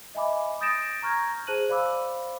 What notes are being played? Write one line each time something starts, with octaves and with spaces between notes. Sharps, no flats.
D#5 E5 G#5 B5 D6
D#6 G6 A6 A#6 D7 E7
A#5 C#6 F6 G6 G#6 A#6
G#4 C5 A5 F#6 D#7 F#7
C5 D5 F5 B5 D6 E6